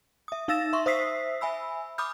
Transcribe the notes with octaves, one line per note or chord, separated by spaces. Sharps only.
E5 D#6
D#4 F5 E6 A6 A#6 E7
E5 C6 C#6
C5 E5 D#6 E6 B6 C7
E5 G#5 B5 E6
B5 D6 D#6 F6 G6